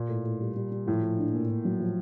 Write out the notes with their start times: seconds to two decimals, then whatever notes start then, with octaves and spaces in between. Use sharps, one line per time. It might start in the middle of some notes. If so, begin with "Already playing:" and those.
Already playing: A#2
0.09 A2
0.25 A2
0.40 G3
0.56 G3
0.72 G3
0.86 A2 F3
1.03 F3
1.18 D4
1.34 A#2
1.49 A#2
1.65 F#3
1.80 F3